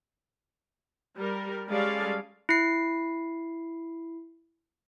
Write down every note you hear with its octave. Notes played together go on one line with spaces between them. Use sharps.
G3 A#4
G3 G#3 C#4 A4 D5 F5
E4 C7